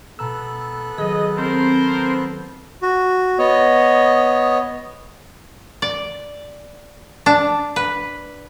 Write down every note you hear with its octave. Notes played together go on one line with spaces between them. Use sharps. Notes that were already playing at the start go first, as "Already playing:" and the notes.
B2 B3 A4 A#5 E6 F#6
D#3 F#3 G#4 D#5
C4 A#4 C5
F#4
B3 C#5 D#5
D5
D4
B4